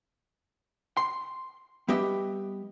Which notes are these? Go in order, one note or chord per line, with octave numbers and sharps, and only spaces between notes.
C6
G3 B3 G4 D#5 E5